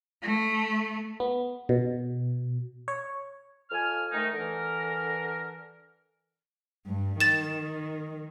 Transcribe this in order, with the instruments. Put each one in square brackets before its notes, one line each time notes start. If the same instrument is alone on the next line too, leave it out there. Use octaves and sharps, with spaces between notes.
[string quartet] A3
[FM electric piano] B3
B2
C#5
[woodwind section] F2 G#5 F6
D#3 A3 D#4
D3 E3 A#4
[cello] G2
[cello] D#3 [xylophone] A6 E7